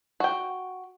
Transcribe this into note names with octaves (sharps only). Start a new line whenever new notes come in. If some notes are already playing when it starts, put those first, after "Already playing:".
F#4 G5